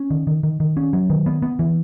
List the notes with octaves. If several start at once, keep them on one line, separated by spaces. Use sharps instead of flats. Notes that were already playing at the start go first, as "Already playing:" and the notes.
Already playing: C#4
D#3
D#3
D#3
D#3
C#4
F#3
D#3
B3
B3
E3